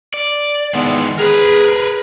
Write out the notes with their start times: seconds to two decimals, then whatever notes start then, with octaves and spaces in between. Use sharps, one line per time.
0.14 D5
0.74 D#3 E3 G#3 B3
1.19 G#4 A#4 B4